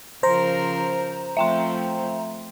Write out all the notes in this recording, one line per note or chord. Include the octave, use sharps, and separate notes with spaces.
C#3 F3 A#4 C5 A#5
F3 A3 C4 E5 G5 C6